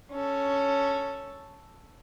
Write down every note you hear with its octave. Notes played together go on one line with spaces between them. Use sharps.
C#4 A4